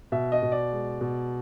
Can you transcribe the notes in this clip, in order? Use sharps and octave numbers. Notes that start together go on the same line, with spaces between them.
B2 E5
D#5
B2
D5
G#3
B2